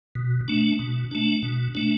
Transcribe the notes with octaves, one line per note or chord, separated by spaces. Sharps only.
B2
A3 D4
B2
A3 D4
B2
A3 D4